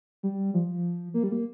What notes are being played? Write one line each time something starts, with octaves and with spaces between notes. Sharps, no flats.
G3
F3
A#3
G3
A#3